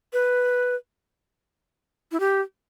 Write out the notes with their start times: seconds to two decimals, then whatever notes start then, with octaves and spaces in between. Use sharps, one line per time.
0.13 B4
2.12 E4
2.20 G4